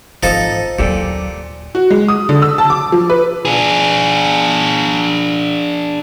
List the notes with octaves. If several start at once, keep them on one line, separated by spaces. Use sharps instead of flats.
G#1 E3 F3 D#4 A4 A5
D#2 A#2 F#3 G4 A4 G5
F#4
G#3
D#6
D3
E6
A5
D6
F3
B4
D4 G#4